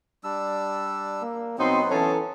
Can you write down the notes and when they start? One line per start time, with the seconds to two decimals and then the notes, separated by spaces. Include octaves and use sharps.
0.24 G3 D4 E6
1.22 A#3
1.58 B2 F#3 B3 C4 D#4 C6
1.91 E3 C#4 A4 A5